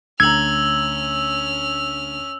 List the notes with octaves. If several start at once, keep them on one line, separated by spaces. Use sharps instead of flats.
D2 C#4 A#5 E6 F6 G#6 F#7